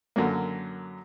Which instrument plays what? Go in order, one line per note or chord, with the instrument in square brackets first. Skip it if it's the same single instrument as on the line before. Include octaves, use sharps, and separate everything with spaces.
[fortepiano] F#2 D3 F#3 A#3